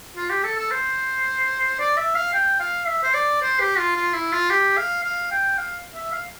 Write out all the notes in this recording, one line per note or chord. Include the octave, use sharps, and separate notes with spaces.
F4
G4
A4
A4
C5
D5
E5
F5
G5
F5
E5
C5
D5
C5
G4
F4
F4
E4
F4
G4
F5
F5
G5
F5
E5
F5